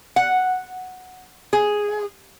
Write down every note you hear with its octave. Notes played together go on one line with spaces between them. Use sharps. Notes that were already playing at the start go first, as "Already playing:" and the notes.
F#5
G#4